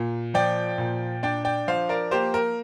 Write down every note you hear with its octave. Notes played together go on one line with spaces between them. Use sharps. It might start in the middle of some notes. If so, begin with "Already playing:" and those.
Already playing: A#2
F3 D5 G5
A#2
D4 D5 G5
D5 G5
F3 C5 F5
A#4 D5
A#3 G4 C5
A#4